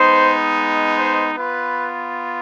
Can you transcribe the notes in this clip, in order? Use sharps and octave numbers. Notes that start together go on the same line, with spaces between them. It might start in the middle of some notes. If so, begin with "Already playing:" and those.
Already playing: G#3 B3 D#4 C5
C5
B3 F4 B4